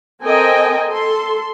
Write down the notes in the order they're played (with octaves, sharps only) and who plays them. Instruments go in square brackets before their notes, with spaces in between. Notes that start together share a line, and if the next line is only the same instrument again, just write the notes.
[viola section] C4 A4 A#4 D#5 G5 G#5
A4 C6